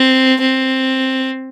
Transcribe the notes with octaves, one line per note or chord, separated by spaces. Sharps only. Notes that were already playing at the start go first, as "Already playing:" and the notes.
Already playing: C4
C4